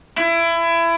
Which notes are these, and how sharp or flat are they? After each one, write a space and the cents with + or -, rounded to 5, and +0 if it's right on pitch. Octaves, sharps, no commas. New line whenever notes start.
E4 +25